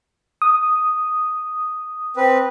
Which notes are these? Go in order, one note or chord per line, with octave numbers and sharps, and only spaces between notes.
D#6
C4 B4